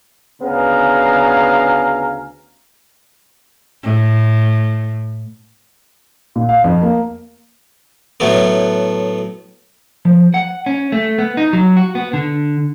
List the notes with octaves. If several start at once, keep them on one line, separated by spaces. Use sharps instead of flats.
D2 C#3 B3 F5 G#5 A#5
A2
A#2
F5
F2
A#3
A2 F#3 A3 B3
F3
F#5
C#4
A3
B3
D#4
F#3
F#4
B3
D3